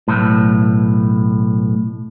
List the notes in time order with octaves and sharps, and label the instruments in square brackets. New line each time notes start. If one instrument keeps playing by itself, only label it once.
[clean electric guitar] B1 A2